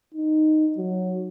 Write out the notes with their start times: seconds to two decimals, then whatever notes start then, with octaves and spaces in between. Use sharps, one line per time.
0.14 D#4
0.77 F#3